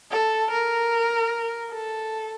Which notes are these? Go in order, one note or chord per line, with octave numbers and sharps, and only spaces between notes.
A4
A#4
A4